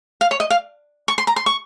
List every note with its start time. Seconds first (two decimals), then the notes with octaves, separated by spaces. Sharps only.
0.21 F5
0.31 C#5
0.40 D#5
0.50 F5
1.08 C#6
1.18 C6
1.27 A#5
1.36 C6
1.46 C#6